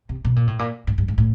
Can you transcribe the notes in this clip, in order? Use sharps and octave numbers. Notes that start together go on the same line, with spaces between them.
C3
B2
A#2
A2
A#2
G#2
G2
G#2
A2